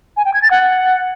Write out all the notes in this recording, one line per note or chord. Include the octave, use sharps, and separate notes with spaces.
G#5
G5
G#6
A6
F#5